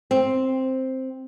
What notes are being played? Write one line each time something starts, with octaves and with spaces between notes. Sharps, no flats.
C4